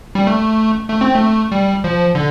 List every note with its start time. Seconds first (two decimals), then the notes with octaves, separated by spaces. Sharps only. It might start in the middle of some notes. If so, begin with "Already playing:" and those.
0.15 G3
0.27 A3
0.90 A3
1.01 C4
1.14 A3
1.52 G3
1.84 F3
2.15 D3